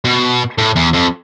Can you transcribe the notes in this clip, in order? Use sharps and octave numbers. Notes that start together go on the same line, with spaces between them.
B2
A2
E2
F2